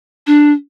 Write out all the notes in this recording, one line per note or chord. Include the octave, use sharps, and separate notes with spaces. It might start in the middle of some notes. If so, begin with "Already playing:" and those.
D4